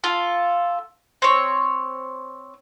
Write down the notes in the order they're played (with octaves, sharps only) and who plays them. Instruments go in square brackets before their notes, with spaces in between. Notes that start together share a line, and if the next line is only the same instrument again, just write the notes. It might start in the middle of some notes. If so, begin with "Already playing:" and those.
[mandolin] F4 A4
C4 C#5